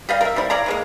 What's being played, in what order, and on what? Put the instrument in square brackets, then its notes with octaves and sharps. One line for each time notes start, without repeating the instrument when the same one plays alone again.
[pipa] G3 D#5 F5
A#4 E5
G3 C4 E4
C#5 D5 F5 A#5
E3 G#3 A#3